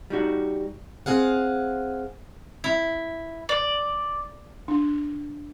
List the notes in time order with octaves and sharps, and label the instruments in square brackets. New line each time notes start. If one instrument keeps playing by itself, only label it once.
[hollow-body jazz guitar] G3 D#4 F#4
[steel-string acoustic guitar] C4 G#4 F5 F#5
[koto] E4
[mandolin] D5
[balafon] D4